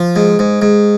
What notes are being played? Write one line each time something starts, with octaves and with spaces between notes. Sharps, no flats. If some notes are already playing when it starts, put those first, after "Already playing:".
Already playing: F3
G#2
G#2
G#2